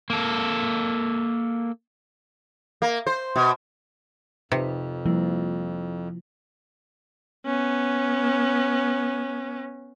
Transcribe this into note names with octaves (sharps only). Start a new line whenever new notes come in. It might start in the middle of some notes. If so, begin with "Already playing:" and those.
A#3 A4
A#3
C5
B2
F2 C3 D#4 B4
F3 G3 A#3 E4
B3 C#4